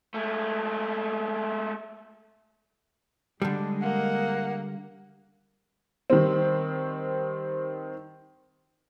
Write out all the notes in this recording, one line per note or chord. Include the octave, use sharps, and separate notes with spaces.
G#3 A3
D3 G3 G#3 D4
A#3 F#5
D#3 G3 C4